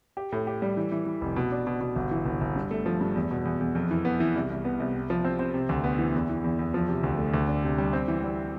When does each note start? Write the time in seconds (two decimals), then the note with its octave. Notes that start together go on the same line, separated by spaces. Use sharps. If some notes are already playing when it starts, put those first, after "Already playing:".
0.17 G4
0.32 A2
0.47 G4
0.62 G3
0.77 E3
0.92 E3
1.06 E3
1.21 F1
1.36 B2
1.51 D4
1.67 B2
1.81 B2
1.96 G1
2.11 E3
2.25 G1
2.41 G1
2.56 G2
2.71 A3
2.86 F3
3.01 G2
3.15 E2
3.31 B2
3.45 E2
3.61 E2
3.75 F2
3.91 E3
4.05 B3
4.20 E3
4.36 C2
4.50 C2
4.65 B3
4.80 C2
4.95 C3
5.10 F3
5.25 C4
5.39 C4
5.54 C3
5.69 D2
5.84 B3
5.99 E3
6.14 E2
6.29 E3
6.44 E2
6.59 E2
6.74 F3
6.89 C3
7.04 D2
7.18 A3
7.34 D2
7.48 D4
7.64 C3
7.78 G3
7.93 C4
8.08 E3
8.23 G3